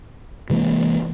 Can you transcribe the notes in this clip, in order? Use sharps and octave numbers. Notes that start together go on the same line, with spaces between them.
C3 E3 G#3 A#3